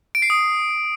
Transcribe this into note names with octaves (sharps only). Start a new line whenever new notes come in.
D7
C7
D#6